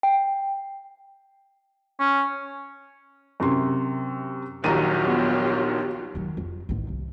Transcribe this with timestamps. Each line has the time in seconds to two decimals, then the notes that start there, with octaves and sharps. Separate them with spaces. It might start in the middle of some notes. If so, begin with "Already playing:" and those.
0.03 G5
2.00 C#4
3.40 F#2 C3 C6
4.64 A#1 D#2 D#3 F#3 F4 G4 A#5 D#7
5.07 B3
6.15 D#3 F#3
6.37 F2
6.69 A1 D#3
6.88 C2